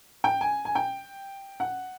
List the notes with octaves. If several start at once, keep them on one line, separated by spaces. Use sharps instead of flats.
G5
G#5
G#5
G5
F#5